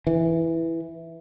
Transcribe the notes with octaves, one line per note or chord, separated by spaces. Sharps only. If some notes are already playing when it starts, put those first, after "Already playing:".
E3